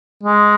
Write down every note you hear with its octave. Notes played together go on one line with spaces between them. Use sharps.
G#3